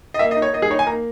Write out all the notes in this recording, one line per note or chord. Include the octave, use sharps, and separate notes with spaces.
D#5
A#3 E5
D#5
D#4
C#5
A#3 D#5
G#4
D#4 C#5
G#5
A#3 A#5